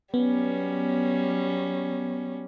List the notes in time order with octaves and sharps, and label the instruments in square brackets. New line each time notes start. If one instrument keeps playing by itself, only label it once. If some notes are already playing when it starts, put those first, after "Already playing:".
[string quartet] F#3 G3 C#4 [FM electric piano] B3